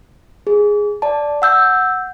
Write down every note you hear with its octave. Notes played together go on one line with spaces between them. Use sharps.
G#4
D5 A5
F#5 E6 G6